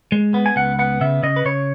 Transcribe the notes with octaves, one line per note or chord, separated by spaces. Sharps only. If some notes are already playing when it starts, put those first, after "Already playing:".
G#3
B3
G#5
C#2 F#5
B3 F#5
C#3 E5
C#3 D#5
B4
C#3 C#5